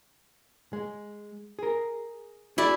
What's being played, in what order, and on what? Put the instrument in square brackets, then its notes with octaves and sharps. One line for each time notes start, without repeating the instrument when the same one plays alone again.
[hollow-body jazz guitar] G#3
G#4 A#4
[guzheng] E4 D5 [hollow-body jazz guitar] F#4 G#4